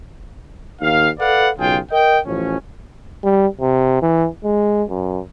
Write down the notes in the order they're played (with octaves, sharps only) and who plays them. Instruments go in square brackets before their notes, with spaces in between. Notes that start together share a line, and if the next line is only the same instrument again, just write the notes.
[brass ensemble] D#2 D#3 F5
A4 B4 D5 F5 F#5
B1 C#3 F4 G#4 G5
A#4 D#5 G5
A1 F3 C#4
[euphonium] G3
C3
E3
G#3
F#2